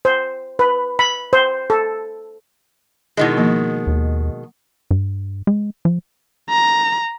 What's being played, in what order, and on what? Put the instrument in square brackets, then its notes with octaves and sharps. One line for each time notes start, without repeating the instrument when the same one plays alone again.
[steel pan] C5
B4
B5
C5
A4
[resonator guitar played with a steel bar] B2 D#3 G#3 [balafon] E4 D#5
[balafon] F3 A#3
[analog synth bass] D#2
G2
G#3
F3
[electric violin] A#5